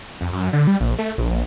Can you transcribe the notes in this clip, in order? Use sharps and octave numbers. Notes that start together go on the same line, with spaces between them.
F2
F#2
D3
G3
A#1
A3
A#1
A#1